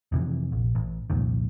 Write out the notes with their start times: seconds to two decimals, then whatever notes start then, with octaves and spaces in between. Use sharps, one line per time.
0.12 F2 C3 E3
0.52 A#1
0.75 A1
1.10 C2 F2 A#2 D#3